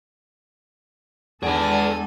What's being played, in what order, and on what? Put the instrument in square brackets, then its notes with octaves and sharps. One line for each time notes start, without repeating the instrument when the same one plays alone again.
[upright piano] E2 D7 [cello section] G#3 A4 [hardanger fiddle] D4 G#5 [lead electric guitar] G#4 B4